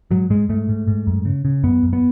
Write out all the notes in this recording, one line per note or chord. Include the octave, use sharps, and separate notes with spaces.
G#2 F#3
G#2 G#3
G#2 A3
G#2
G#2
F#2
C#3
C#3
F#2 B3
F#2
B3